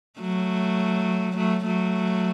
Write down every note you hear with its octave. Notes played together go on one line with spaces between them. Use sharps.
F#3 A3
F#3 A3
F#3 A3